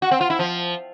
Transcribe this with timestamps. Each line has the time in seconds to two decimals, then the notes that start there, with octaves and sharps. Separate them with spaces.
0.02 F#4
0.11 C4
0.21 F4
0.30 E4
0.39 F3